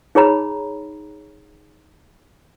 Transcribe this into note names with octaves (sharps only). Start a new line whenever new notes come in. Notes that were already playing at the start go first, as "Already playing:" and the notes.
D#4 G#4 C#5 A#5 B5